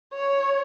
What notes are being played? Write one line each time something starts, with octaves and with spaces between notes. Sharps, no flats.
C#5